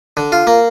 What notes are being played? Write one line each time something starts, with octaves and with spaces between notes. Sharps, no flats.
D3
F4
A#3